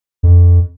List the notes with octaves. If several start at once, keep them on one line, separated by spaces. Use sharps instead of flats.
F2